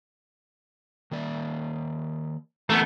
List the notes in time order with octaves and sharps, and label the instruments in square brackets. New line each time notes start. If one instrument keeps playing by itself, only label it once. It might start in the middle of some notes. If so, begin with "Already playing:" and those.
[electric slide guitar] D#3 A#3 D5
[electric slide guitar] E3 C#4 A#5 [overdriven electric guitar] A3 B3